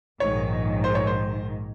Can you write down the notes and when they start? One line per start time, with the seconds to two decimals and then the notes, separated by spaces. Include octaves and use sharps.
0.20 A#1 G#2 D#3 C#5
0.84 C5
0.95 C#5
1.07 C5